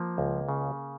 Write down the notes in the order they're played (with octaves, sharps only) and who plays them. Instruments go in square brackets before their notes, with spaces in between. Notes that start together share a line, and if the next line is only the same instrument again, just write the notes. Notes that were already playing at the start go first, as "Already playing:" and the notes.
Already playing: [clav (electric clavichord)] F3 A#3
C#2
C#3